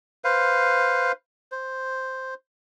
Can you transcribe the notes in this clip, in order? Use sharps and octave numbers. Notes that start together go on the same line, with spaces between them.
B4 C5 F5
C5